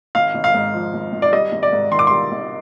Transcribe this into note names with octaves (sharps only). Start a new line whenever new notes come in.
G#1 F5
G#1
F5
G#2
F3
G#1
G#1
D5
G3 D#5
G#1
D5
G#2
D#3 C6
D6
G3 C6
G#1